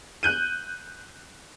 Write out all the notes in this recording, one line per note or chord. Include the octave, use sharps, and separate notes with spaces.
F#6 G6 D#7